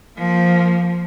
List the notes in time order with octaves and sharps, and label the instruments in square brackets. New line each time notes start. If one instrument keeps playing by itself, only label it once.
[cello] F3 A#3